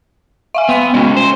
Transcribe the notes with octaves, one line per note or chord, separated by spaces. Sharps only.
E5 F5 G#5
B3 G5 C6 D#7
G#3 A3 C#4 D#5
C5